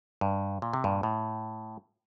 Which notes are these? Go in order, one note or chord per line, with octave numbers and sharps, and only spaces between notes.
G2
A#2
C3
G2 A#2
A2